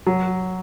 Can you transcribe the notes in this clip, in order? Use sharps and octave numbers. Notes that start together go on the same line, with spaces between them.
F#3